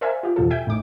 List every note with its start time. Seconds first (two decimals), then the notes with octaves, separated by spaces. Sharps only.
0.01 A#4 C5 D5 E5 F5 G#5
0.23 F4 G4
0.36 E2 B2 F3 A4
0.50 E5 G5 G#5 G6
0.66 A1 A2 D#4 D6